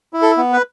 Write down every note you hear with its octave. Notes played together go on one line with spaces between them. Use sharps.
E4
A4
B3
B4